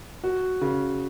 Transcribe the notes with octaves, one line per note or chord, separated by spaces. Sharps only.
F#4
C#3